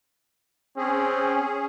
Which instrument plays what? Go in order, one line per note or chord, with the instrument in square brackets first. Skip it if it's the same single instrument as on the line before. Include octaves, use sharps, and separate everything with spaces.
[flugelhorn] C4 [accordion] C#4 G#4